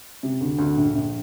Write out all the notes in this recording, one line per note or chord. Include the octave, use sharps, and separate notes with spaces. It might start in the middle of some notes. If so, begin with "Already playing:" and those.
C3
D2
D2
A#1
A#1